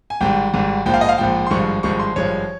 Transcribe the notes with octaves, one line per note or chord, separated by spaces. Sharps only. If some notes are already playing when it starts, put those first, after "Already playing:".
G#5
G#1 G#2 G3 G5
G#1 G#2 G3
A#1 G#2 F3 G5
F5
D#5
F5
A#1 G#2 F3 G5
C6
G#1 G2 F3 G#3 C#6
G#1 G2 F3 G#3 C#6
C6
G#1 G2 F3 G#3 C#5